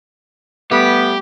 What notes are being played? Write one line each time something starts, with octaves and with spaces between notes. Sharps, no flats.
G3 A3 B3 G4